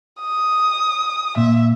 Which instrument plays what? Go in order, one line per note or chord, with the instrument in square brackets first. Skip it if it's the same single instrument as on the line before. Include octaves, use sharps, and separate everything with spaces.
[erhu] D#6
[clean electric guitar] A#2 [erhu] E5